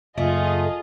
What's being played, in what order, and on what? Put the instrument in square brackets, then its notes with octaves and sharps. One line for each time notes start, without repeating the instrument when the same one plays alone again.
[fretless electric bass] F#1 [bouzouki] A3 [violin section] F4 G#4 D#5